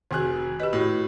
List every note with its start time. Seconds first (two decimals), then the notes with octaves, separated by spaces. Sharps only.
0.11 F1 D#3 F#4 G#4 F#6
0.60 G4 B4 D#5
0.73 A2 F#4